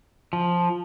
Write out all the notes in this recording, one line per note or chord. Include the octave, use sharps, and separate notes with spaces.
F3